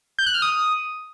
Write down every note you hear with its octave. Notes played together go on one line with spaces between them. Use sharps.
G6
F#6
F6
D#6